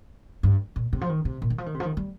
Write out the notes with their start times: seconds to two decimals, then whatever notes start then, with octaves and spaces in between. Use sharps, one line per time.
0.43 G2
0.76 A#2
0.93 C3
1.01 F3
1.09 D#3
1.25 C3
1.42 A#2
1.50 D#3
1.58 F3
1.66 D#3
1.74 C3
1.80 F3
1.85 D#3
1.97 G3